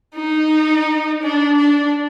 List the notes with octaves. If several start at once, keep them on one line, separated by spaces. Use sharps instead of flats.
D#4
D4
D4